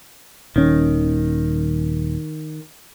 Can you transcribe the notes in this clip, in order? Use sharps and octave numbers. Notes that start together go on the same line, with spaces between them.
D#1 D#3 C#4